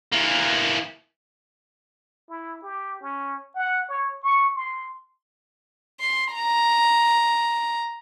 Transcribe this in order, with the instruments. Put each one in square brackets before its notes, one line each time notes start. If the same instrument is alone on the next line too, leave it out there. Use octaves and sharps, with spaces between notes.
[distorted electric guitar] E3 A#3
[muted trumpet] E4
G4
C#4
F#5
C#5
C#6
C6
[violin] C6
A#5